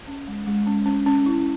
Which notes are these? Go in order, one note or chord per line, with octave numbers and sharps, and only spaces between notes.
C#4
G#3
G#3
C#4
C#4
C#4
E4